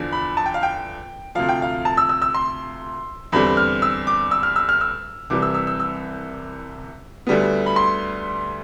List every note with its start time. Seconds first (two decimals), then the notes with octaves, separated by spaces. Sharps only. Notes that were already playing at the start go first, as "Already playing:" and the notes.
Already playing: E2 D3 F3 D4
0.12 B5
0.37 A5
0.46 G5
0.54 F5
0.63 G5
1.35 D2 C3 F3 F5
1.49 G5
1.62 F5
1.85 A5
1.97 E6
2.09 E6
2.22 E6
2.34 C6
3.32 E2 D3 G3 C4 B5
3.57 F6
3.82 E6
4.07 D6
4.31 E6
4.43 F6
4.56 E6
4.69 F6
4.81 E6
5.30 C2 C3 E3 G3 D6
5.42 E6
5.54 E6
5.67 E6
5.80 E6
7.27 D2 D3 G3 B3
7.66 B5
7.76 C6